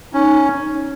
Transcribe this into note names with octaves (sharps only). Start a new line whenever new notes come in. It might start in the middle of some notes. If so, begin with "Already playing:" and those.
C#4 D#4